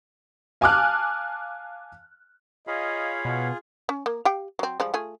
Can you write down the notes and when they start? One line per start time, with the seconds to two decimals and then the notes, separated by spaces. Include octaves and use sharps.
0.61 F5 G#5 A5 D6 F6 F#6
2.67 F4 G#4 C#5 D#5 F5 B5
3.25 B2 F#5
3.89 C#4
4.06 A#3
4.25 G4 F5 G5
4.59 F#3 C4
4.80 F3 G3 G#3
4.94 A3 F4 G#4